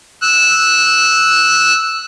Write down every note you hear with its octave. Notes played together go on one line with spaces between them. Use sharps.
E6 F#6